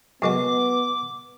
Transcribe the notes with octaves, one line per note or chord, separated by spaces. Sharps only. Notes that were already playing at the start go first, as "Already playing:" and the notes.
F#2 G#3 B3 F#4 D6